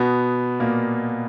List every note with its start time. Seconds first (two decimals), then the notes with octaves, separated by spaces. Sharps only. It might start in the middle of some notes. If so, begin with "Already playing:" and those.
Already playing: B2 B3
0.60 A#2 A#3